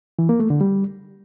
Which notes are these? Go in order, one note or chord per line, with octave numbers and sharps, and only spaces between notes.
E3
A#3
A3
D3
G3